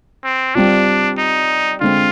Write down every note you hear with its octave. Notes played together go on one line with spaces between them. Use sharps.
C4
G3 C4 D4 F4
D#4
D3 G#3 C4 F4